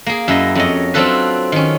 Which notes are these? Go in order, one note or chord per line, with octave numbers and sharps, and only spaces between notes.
A#3 G#4
F#2 E4 D#5
F2 C#5 D#5
F#3 C4 D4 F4 A4 B4
D#3 C#4